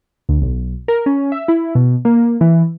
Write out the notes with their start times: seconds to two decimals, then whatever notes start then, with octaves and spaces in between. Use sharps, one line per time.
0.29 D2
0.42 B1
0.88 A#4
1.06 C#4
1.32 E5
1.48 E4
1.75 B2
2.05 A#3
2.41 E3